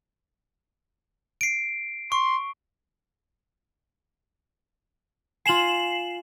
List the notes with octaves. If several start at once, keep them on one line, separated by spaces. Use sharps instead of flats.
C7 D7
C6 C#6
F4 G#5 C7 E7 F#7